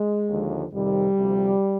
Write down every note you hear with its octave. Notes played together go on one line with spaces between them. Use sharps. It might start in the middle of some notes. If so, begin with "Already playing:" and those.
Already playing: G#3
D#2 D3 F3
F2 C3 D#3 G3
D2 C3 F3